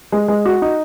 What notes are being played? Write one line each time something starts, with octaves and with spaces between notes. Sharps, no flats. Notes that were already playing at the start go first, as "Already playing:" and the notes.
G#3
G#3
F#4
D#4